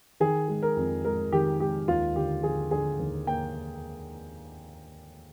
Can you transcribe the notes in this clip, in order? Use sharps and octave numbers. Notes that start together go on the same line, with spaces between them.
D#3 G#4
G#3
A#4
F2
G#3 A#4
D#3 G4
G#3 G4
D#2 F4
D3 G4
D3 G#4
D3 G#4
D#2
A#3 G5